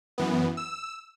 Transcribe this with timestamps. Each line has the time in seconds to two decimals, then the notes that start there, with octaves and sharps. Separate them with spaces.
0.18 F#2 E3 B3
0.57 E6